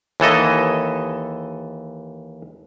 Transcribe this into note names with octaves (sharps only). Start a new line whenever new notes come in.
D#2 E3 A4 D#5